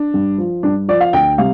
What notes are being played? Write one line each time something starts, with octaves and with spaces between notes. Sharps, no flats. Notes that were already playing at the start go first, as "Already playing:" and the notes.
Already playing: D4
G2
F3
G2 D4
F3 D5
F5
D2 G5
C3 G3 F5